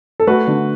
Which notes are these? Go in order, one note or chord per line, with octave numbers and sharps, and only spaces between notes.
A4
A3 F#4 B4
D3